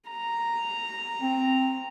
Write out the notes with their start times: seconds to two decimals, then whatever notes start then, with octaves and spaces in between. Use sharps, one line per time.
0.10 A#5
1.21 C4